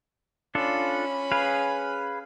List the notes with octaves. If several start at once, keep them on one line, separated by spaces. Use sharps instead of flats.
C#4 D4 F4 A4 B5
G#4 B4 F5